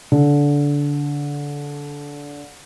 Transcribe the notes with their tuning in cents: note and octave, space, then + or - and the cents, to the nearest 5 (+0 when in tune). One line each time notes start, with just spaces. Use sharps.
D3 -20